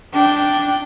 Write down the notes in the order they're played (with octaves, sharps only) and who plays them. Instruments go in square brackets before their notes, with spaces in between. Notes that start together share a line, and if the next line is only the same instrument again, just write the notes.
[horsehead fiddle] D4 G5